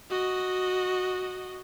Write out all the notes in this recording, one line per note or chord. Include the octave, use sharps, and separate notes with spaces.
F#4 D#5